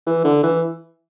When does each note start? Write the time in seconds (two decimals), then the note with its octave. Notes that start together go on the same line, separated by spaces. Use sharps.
0.06 E3
0.24 D3
0.43 E3